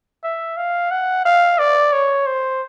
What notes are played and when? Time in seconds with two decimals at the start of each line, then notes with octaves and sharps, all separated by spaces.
0.24 E5
0.57 F5
0.91 F#5
1.25 F5
1.58 D5
1.92 C#5
2.26 C5